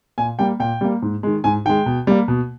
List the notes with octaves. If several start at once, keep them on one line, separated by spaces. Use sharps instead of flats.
A#2 G#5
G3 A#3 G5
A#2 G5
G3 A#3
G#2
D#3 G#3
G#2 G#5
D#3 G#3 G5
B2
G3 A#3
B2